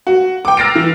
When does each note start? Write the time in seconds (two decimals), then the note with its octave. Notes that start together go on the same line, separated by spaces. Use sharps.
0.07 F#4
0.45 G5 D6
0.57 E6 F6 A6 A#6 C7 D7
0.75 E3